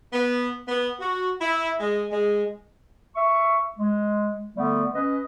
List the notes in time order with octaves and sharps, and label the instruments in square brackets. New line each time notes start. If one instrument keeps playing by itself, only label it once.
[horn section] B3
B3
F#4
E4
G#3
G#3
[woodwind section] E5 C#6
G#3
D3 G3 A3 B3
C#4 B4 D#5